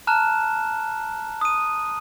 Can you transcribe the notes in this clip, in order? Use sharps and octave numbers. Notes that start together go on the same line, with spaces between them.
A5 A#5 F6 F#6 E7
D#6 D#7